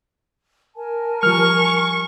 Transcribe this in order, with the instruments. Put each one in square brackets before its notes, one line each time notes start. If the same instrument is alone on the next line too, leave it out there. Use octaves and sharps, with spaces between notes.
[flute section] A#4 G#5 A5
[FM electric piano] F3 G3 [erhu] C#6 [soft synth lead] F6